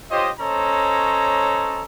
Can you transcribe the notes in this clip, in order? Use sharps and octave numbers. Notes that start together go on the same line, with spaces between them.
F4 G4 C5 C#5 D#5
C#4 A4 C5 C#5 D#5 A#5